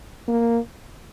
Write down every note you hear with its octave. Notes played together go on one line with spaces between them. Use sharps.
A#3